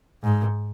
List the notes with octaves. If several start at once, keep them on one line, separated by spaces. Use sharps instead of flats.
G#2